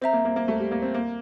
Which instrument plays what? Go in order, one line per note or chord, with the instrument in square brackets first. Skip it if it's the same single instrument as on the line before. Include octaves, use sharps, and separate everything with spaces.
[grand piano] C4 [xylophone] C5 E5 A#5
[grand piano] A#3
A#3
A#3
A3
G3
A#3
C4
A#3